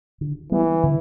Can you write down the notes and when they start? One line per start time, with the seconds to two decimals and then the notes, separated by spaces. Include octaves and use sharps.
0.21 D3
0.52 E3 G3 B3
0.83 D3